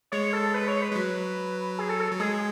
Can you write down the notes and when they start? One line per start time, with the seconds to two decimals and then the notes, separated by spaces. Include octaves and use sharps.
0.12 G#3 C#5
0.33 A4
0.54 B4
0.68 C#5
0.82 B4
0.92 G#3
0.95 F#3
1.79 G#4
1.89 A4
2.00 A4
2.12 F#3
2.20 G#3 G#4